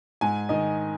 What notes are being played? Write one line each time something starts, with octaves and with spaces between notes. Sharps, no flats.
G#2 G#5
D#3 D#5